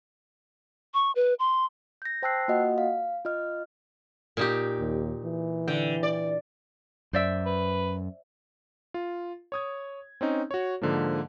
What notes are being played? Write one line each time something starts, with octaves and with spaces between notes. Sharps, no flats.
C#6
B4
C6
G6 A#6
C5 G5 A5 E6 F#6 C7
A#3 F4 F#4 D#5 F#5
F5
F4 D#5 F6
A#2 D#4 G4
D#2
E3
D3 G5
D5
F#2 C5 D5 E5
B4
F4
C#5 D#6 G#6
C4 C#4 D#4
F#4 C#5
G#2 D3 F3 A#3